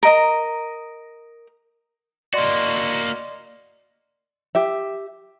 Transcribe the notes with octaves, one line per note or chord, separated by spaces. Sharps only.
A#4 D#5 A#5
A#3 F#4 D5 D#5 C6
G4 E5